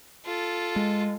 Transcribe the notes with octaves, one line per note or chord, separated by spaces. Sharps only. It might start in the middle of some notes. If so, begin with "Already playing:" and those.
F4 A4
G#3